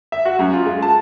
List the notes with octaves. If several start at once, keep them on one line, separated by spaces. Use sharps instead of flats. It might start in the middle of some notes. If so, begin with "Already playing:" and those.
E5
F#4
F#2
F4
G#3
A5